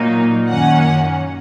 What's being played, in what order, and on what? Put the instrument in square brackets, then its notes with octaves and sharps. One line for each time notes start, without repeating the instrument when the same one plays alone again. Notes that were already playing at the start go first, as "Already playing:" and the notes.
Already playing: [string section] A#2 F#3 A#3 D#4
F#2 D#3 A#3 C#4 F#5